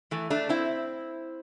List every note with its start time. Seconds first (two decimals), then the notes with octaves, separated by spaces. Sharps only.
0.11 E3 A3
0.30 A3 D4
0.49 C4 E4